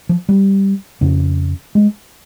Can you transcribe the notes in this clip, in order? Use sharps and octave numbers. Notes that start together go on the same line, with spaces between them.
F3
G3
F2 C#3
G#3